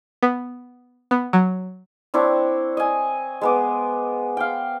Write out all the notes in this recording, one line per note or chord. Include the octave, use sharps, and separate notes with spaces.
B3
B3
F#3
C4 D4 E4 C#5
D#5 G#5
G#3 B3 D6
F5 G5